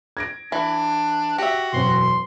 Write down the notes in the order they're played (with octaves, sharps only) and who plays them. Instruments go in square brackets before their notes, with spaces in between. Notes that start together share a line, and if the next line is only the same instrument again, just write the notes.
[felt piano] G#6 A#6 D7
[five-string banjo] E3 [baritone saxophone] D4
[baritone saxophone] F#4 [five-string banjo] G4 E5
[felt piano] E1 F#2 C#4 [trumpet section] C6